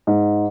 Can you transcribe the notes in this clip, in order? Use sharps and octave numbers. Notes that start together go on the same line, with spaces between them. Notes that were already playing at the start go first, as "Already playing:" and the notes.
G#2